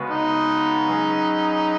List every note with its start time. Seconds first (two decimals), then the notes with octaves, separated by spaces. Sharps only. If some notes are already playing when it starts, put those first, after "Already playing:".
Already playing: C#3 G#3 B3 F#4 B4
0.10 D#4
0.88 F#3 C#4 G#4 B4